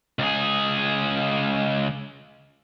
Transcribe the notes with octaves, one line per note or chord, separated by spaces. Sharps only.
C#2 G#4